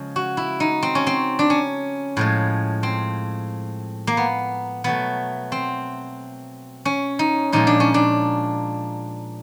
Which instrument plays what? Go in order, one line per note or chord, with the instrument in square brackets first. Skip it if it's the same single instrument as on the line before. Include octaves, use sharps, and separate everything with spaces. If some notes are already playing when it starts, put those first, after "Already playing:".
Already playing: [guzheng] C#3 F3 G#3
F#4
E4
D#4
C4
C#4
C4
D4
C#4
A2 F3 G#3
C4
A#3
B3
B2 F#3 A3 B3
C4
C#4
D#4
A#2 F3 G#3 D#4
D4
C#4
D4